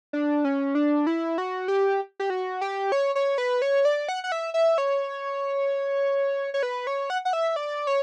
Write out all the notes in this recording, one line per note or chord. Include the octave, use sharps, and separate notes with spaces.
D4
C#4
D4
E4
F#4
G4
G4
F#4
G4
C#5
C#5
B4
C#5
D5
F#5
F#5
E5
E5
C#5
C#5
B4
C#5
F#5
F#5
E5
D5
C#5